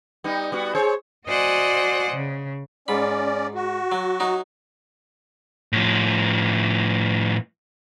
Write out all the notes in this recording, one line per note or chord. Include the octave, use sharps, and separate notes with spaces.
G3 B3 D#4
G3 B3 F#4
G#4 C5 C#5
F#4 C5 D5 D#5 F#5 G#5
C#3
G#2 C#4 D5 B5
F#4
F#3
F#3 D#4
A2 F3